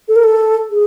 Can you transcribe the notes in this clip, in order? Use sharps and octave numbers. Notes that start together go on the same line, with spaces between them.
A4
A#4
A4
G#4